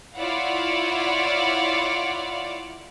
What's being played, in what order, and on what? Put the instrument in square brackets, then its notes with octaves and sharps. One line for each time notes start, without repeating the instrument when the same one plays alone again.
[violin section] E4 F4 C#5 D5 F5 F#5